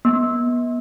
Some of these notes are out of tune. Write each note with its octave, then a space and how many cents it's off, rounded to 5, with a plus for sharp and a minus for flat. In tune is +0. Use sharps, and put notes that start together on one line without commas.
B3 -30